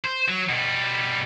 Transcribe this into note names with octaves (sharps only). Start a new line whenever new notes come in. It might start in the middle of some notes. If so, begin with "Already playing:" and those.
C5
F#3
B2 G3